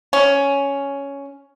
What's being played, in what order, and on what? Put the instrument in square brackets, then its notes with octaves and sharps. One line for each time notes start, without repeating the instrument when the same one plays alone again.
[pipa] C#4